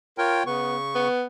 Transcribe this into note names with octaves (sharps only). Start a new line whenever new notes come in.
F4 A#4 C#5 G5
C#3 B3 C#6
B3